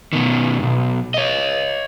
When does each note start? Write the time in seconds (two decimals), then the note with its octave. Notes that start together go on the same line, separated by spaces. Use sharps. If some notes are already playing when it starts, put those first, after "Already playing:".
0.13 B2 D#3
0.59 B1 G2
1.14 C#5 D#5